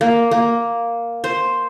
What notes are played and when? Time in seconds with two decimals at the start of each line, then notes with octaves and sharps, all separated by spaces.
0.01 A#3
0.31 A#3
1.24 C5